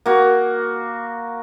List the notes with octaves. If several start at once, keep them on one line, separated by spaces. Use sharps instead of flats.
A#3 F#4